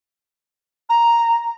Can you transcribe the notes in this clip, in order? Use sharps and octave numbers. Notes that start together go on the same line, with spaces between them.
A#5